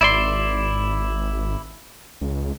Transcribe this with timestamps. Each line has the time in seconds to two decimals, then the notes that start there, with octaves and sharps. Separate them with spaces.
0.01 G#1 E4 D5 C6
2.21 C#2